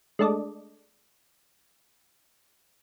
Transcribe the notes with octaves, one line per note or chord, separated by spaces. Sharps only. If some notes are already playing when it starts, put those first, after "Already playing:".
G#3 A3 D4 A4 D5 D#5